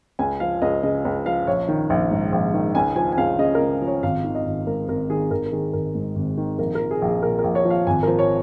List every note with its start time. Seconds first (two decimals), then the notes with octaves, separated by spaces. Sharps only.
0.19 C#2 G#5
0.40 F3 F5
0.62 C#2 D#5
0.83 C#3 D#5
1.05 C#2
1.26 F3 F5
1.47 A#1 C#5
1.68 D#3
1.90 A#1
2.11 G#2
2.32 A#1
2.54 D#3
2.75 C#2 G#5
2.96 F3 G#5
3.12 G#5
3.18 C#2 F5
3.39 C#3 D#5
3.55 A#4
3.61 C#2
3.82 F3
3.87 C#5
4.03 G#1 F5
4.24 D#3
4.35 D#5
4.46 G#1
4.67 G#2 A#4
4.88 G#1 A#4
5.10 D#3 G#4
5.31 G#1 A#4
5.46 A#4
5.52 D#3 G#4
5.73 G#1 A#4
5.95 G#2
6.16 G#1
6.37 D#3
6.59 A#1 A#4
6.75 F3 A#4
6.91 G#4
7.02 A#1 G#4
7.23 A#2 A#4
7.39 A#4
7.44 A#1
7.55 C#5
7.65 F3
7.70 F5
7.87 G#1 G#5
8.03 F3 A#4
8.19 C#5